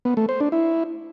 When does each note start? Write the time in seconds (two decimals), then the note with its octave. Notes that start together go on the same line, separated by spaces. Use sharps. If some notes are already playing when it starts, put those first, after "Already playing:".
0.05 B3
0.17 A3
0.29 C5
0.40 D4
0.52 E4